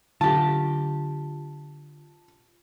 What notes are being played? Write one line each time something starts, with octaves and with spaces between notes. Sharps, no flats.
D3 F#3 F4 G4 A5